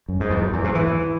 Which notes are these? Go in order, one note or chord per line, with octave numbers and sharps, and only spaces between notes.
F#2
G#2
E2
F#2
E2
G#2
E3